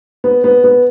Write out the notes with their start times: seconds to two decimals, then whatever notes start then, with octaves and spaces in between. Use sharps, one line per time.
0.24 B3
0.44 B3
0.64 B3